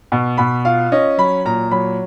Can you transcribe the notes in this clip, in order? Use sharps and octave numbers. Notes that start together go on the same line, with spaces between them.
B2
B2 B5
F4 F5
C#4 D#5
F#3 B5
A#2 A#5
F#3 B5